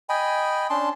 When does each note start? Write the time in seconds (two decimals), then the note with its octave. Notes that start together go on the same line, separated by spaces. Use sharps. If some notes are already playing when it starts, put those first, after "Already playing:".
0.09 D#5 G5 G#5 B5
0.70 C#4 D4 A5 C6